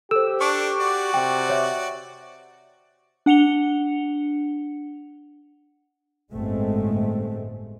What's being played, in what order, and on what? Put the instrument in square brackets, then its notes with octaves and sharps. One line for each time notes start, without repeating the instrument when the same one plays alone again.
[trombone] G4 [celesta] A4 C5 [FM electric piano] E6
[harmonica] D4 [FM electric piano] C#6 D6
[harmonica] F#4 D5
[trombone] C3 [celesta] G5
[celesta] C#5 E5
[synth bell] D4 F#5 C#7 F7 G7
[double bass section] G1 A2 G#3 A3 C4